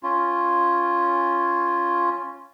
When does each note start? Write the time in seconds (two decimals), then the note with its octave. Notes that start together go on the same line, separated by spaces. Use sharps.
0.03 C#4 F4